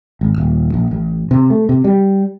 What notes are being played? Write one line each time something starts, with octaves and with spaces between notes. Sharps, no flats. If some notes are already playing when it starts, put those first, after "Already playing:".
G#1
D#1
A#1
A1
C3
A3
C3
G3